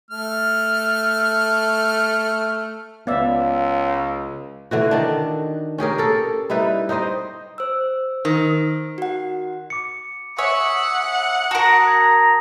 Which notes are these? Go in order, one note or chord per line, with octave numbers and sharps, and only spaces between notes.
A3 F6
C#2 B3 D5 E5 F5 E6
D3 E3 F#4
D#3 D4
C#4 G4 G#4 A#4
A4 A#4
G3 D#4 E4 B4
D#4 G4 C5 D#5
C5 E6
D#3
F#4 F#5
D6 C#7
C#5 E5 F#5 G#5 D#6
F#4 A#4 A5 A#5 D#6
G#6